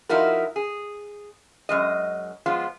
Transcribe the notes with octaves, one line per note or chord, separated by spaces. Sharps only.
F3 D#4 E4 F#4 A#4
G#4
F#2 G#3 D#5
F3 G#3 B3 F4